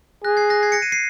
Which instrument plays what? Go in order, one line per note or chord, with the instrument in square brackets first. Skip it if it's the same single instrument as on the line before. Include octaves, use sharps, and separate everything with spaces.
[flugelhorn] G#4 [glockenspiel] F#6 A#6
[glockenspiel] G#6 C7
F#6 A#6
G#6 C7
A#6 C#7
C7 D#7
C7 D#7